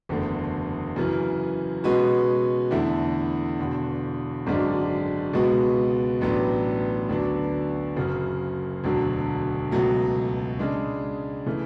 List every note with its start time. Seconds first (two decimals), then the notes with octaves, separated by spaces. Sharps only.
0.09 F#1 E2 D3 A3
0.96 F#2 C#3 E3
1.84 B2 G#3 C#4 F#4 B4
2.71 E2 D3 A3 E4
3.59 E1 E2 D3
4.46 G#1 F#2 D3 G#3 D4
5.33 C#2 B2 G#3 B3 F#4
6.21 A1 A2 F#3 B3 D4
7.09 D2 D3 F#3 B3 D4
7.96 F#1 F#2 C#3
8.84 E1 D2 D3 F#3
9.71 C#2 B2 F#3 A3
10.59 C#3 G#3 D4
11.46 C#3 E3 A3